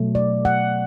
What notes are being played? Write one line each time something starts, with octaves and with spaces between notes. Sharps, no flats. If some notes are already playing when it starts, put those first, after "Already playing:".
Already playing: B2 F#3 A3
D5
F#5